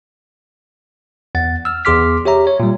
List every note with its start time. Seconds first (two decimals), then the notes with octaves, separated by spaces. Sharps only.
1.35 E2 F#5 A6
1.65 E6 F6
1.85 E2 G#4 C6 D6 F6 B6
2.25 G4 C#5 E5 A#5
2.47 C#5
2.60 A#2 G3